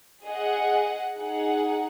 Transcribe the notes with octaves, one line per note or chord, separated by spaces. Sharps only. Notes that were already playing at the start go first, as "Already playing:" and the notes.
G#4 D#5 F#5
D#4 G#4 F#5